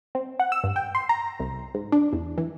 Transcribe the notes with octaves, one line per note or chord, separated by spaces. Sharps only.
C4
F#5
E6
G2
G5
C6
A#5
C2
G#2
D4
E2
E3